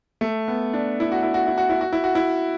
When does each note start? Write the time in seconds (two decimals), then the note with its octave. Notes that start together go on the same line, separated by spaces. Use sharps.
0.21 A3
0.48 B3
0.74 D4
1.00 E4
1.12 F#4
1.23 E4
1.34 F#4
1.47 E4
1.58 F#4
1.69 E4
1.81 F#4
1.93 E4
2.04 F#4
2.15 E4